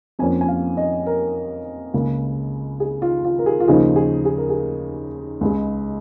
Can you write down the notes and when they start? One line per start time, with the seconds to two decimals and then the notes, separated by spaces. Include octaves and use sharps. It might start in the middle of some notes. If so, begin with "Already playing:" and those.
0.19 F2 F3 A#3 C#4 G#5
0.41 G#5
0.48 F5
0.77 D#5
1.06 A#4
1.94 C#2 C#3 A#3
2.80 G#4
3.02 F4
3.24 F4
3.39 A#4
3.46 G#4
3.60 F4
3.68 D#2 C#3 F3 A#3 D#4 G#4
3.96 G#4
4.25 G#4
4.38 A#4
4.50 G#4
5.41 C#2 C#3 G#3